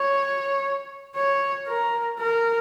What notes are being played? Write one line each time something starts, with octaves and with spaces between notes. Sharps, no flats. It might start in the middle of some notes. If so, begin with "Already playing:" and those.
Already playing: C#5
C#5
A#4
A#4